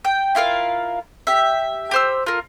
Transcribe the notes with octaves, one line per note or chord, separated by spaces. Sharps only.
G5
E4 F4 A#4 F5
G4 E5
G4 C5 E6
F4 A#4